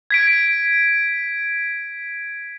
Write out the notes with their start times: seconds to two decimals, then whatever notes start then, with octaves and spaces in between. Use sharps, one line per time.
0.10 G#6 B6 D7